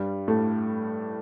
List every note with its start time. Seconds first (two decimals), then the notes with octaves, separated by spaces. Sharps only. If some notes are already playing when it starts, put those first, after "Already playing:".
Already playing: G2 G3
0.28 A2 A3